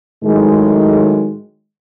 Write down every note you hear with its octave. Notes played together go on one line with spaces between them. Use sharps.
A2 D#3 F#3 G#3